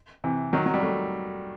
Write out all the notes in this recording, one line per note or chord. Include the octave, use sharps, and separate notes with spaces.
C3 E3
D#3 F#3
F#3
G3
F#3 A3